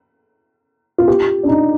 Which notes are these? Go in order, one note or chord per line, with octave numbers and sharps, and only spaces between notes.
F4
G4
D4
D#4